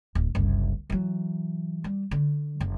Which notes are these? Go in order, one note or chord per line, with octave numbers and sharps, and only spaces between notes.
D1
F#1 C2
E3 F#3
G3
D3
F#1